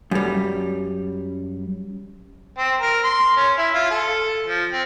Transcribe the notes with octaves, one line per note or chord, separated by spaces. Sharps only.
F#2 G3
C4
A#4
C6
C#4
E4
F4
A4
F3
C4